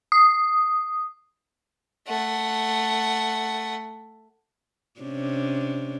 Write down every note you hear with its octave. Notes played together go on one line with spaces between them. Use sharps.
D#6
A3 F#5
C3 C#4 D4